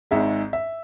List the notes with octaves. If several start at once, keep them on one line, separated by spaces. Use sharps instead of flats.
G#1 G#2 G#3 E5
E5